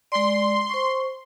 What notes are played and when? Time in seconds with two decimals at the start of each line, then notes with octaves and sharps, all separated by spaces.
0.12 G#3 D5 C6
0.69 C5 C#6